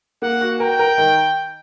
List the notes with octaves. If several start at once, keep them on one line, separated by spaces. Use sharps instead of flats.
A#3 F#5
F#4
A#4 G5
A#4
D#3